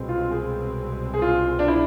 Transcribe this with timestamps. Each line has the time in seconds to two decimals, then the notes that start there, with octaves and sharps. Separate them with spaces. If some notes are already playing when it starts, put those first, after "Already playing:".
Already playing: C2 B2 G#3 C4
0.09 F4
0.31 G#4
1.13 G#4
1.22 F4
1.59 D4
1.68 E4